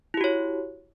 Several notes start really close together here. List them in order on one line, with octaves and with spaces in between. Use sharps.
E4 G4 F#4 C#5